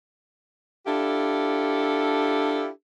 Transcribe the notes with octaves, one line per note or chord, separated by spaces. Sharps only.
D4 E4 F4 G4 A4